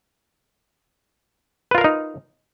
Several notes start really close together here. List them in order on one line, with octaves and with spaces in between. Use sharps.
B4 F4 A#4 F5 D#4